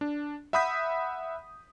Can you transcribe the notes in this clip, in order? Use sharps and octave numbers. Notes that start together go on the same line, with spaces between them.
D4
E5 F#5 B5 D#6 G6 B6